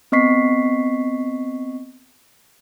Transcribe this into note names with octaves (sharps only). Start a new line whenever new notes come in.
B3 C4 D#5 C#6 B6 C7